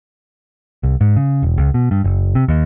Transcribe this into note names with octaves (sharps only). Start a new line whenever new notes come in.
C2
G#2
C#3
E1
C#2
B2
G2
F#1
C3
D#2